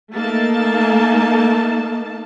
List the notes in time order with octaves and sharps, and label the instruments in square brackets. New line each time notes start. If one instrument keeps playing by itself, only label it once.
[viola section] A3 A#3 D#4 A5